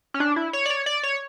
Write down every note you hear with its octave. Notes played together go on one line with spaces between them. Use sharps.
C#4
D4
E4
C#5
D5
C#5
D5
C#5